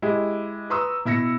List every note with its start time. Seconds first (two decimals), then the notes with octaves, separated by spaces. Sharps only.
0.02 G#3 E4 G4
0.70 B4 A#5 C6 C#6 D#6 E6
1.05 B2 E4 E6 A#6 C#7